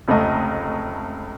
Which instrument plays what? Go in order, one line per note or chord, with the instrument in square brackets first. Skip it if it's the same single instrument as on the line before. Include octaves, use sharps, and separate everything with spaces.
[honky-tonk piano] F1 C#2 A3 D#5